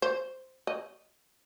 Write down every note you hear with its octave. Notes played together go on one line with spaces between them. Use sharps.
C5
D#5